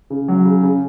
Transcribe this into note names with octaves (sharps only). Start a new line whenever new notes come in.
C#3
F#3
C#3
C#3